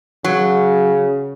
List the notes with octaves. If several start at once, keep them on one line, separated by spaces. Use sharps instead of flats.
C#3 F#3